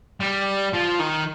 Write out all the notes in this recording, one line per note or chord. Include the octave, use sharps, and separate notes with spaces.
G3
F3
D#3